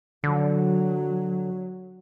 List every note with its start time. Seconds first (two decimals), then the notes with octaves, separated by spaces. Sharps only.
0.24 D3 F#3